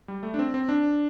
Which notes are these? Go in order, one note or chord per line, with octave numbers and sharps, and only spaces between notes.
G3
A3
D4
C4
C4
D4